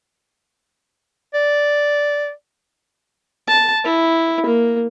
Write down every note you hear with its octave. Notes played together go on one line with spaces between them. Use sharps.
D5
A5
E4
A#3